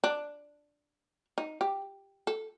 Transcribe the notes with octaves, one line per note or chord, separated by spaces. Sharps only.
D4
D#4
G4
A4